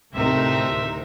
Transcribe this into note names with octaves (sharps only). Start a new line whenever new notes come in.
D2 A2 C3 A3 C4 D#4 A#4 E5